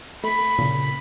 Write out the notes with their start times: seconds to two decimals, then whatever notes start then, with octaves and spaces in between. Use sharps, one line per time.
0.24 A3 B5
0.58 A#2 C#3